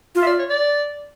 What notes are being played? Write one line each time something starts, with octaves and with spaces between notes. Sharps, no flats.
F4
E5
D5
C#5
D5